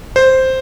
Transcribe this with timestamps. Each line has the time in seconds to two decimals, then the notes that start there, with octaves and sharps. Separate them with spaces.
0.16 C5